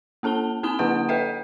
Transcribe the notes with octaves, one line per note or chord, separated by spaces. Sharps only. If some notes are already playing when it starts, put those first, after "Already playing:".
A#3 C#4 A4 A5 G7
C4 D#4 G#5 D#6 G7
D3 A#3 E4 B4 F#5 D#6
A4 B4 D#5 E5 G5